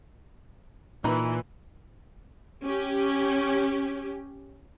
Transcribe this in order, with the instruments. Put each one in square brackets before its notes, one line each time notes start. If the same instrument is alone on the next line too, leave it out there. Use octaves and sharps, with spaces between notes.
[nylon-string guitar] A#2 [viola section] E3 [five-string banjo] D#4 B5
[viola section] C#4 G4